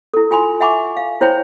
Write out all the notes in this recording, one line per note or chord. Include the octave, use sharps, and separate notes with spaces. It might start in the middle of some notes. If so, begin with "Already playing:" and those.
E4 A4
F4 G#5 B5 C6
E5 F#5 G#5 B5 C#6 D6
F5
E4 C5 C#5 G5 B5